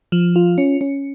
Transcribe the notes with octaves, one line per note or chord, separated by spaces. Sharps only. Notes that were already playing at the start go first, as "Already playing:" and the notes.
F3
F4
C#4
C#4